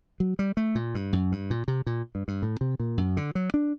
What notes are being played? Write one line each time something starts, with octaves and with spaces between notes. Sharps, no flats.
F#3
G3
A3
A#2
G2
F#2
G2
A#2
C3
A#2
G2
G2
A2
C3
A#2
F#2
D3
F#3
D4